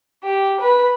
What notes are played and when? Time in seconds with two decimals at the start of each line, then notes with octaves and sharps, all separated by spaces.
0.24 G4
0.61 B4